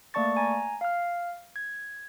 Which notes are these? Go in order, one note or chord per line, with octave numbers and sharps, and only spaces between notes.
A3 A#3 D5 A5 C#6 A6
G#5 A#5
F5 F6
G#6